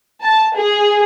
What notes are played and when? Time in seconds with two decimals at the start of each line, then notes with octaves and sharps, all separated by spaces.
0.23 A5
0.56 G#4